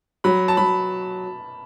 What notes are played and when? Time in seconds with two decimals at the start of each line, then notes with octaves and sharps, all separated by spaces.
0.24 F#3 B5
0.48 A5
0.57 F#3 B5